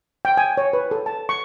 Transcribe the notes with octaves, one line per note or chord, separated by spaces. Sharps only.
G5
G#5
C#5
B4
A4
A5
C#6